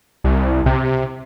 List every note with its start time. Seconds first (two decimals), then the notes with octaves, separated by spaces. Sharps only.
0.24 C2
0.66 C3